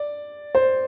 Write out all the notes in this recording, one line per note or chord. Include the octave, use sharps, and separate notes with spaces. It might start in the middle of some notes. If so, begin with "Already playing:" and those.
Already playing: D5
C5